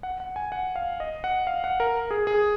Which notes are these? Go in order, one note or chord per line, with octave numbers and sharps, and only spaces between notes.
F#5
F#5
G#5
F#5
F5
D#5
F#5
F5
F#5
A#4
G#4
G#4